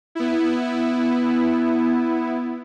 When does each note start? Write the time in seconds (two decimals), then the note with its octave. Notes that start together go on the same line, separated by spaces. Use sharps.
0.15 B3 E4